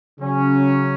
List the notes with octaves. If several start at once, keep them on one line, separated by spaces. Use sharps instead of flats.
C#3 F#3 C#4